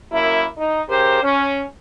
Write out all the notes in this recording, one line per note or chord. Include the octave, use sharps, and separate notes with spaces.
F#2 A#3 E4
D#4
C#3 G4 A#4 C5
C#4